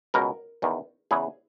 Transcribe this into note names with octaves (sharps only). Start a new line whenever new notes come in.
C#2 B2 A#4
E2 D#3
E2 C#3 E3 G#4